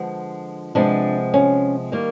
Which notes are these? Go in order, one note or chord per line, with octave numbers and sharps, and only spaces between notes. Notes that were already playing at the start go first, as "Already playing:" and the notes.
Already playing: D3 F3 G#3 B3
C3 F3 G#3 B3 D4
C#4
D#3 G3 A#3